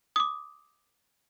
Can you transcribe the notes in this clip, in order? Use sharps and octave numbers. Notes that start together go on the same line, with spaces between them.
D6 D#6